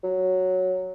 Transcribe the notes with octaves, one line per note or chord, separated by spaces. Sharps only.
F#3